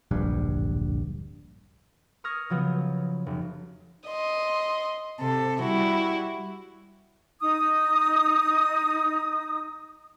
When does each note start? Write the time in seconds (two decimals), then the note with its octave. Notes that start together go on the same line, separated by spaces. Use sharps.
0.11 D1 A#1 G2
2.24 C#6 D#6 F6 G#6 A#6
2.50 C#3 F3 F#3 B3
3.26 F1
4.08 D#5 C6
5.19 C3 A4
5.61 G3 E4 F#4
7.40 D#4 D#6